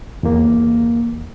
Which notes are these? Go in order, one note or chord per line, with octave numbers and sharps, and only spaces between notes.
E2 A#3